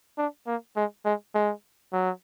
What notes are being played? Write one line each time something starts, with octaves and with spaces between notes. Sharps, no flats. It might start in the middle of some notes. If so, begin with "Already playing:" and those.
D4
A#3
G#3
G#3
G#3
F#3